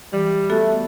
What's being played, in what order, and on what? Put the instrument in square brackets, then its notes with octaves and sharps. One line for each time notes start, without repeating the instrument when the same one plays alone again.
[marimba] E3 [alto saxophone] G3
[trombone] A3 [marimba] B3 F#4 A4